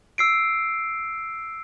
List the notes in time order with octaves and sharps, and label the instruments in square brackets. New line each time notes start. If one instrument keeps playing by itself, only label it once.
[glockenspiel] E6 C7 D7